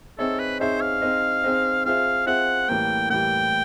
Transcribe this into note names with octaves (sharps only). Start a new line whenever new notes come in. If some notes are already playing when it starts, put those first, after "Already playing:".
C4 D#4 G#4 A4 C#5 E5
B4
C4 D#4 G#4 C5 C#5 E5
F5
C4 D#4 G#4 C5 D#5
C4 D#4 G#4 C5 D#5
C4 F4 G#4 C5 E5 F5
C4 F4 G#4 C5 E5 F#5
A2 E3 G3 A#3 G5
A2 E3 G3 A#3 G5